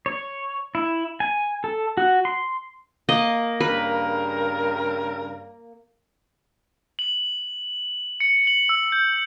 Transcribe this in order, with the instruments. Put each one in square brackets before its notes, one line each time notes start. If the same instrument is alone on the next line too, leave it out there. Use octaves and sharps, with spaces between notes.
[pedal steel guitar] C#5
E4
G#5
A4
F#4
C6
[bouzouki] A#3 [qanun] D#5
[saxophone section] G2 C#3 A#4 [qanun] B4
[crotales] F#7
C#7
F#7
E6
G6